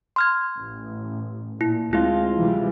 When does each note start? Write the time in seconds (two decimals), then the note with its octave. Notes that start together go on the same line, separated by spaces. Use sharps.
0.16 C6 F6 G#6
0.58 A1
1.61 A#2 E4
1.93 D2 G#3 C4 E4 F4
2.36 C3 E3 G3